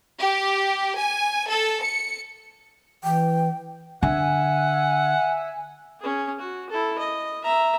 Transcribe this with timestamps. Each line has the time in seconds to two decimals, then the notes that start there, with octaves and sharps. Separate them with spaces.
0.20 G4
0.96 G#5
1.47 A4
1.83 C#7
3.04 E3 G5
4.03 D3 E5 F#5 G#5
6.00 C#4 G#4
6.40 F#4
6.70 E4 A4
6.99 D#5
7.44 E5 A#5